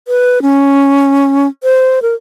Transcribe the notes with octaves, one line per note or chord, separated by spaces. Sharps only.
B4
C#4
C5
A#4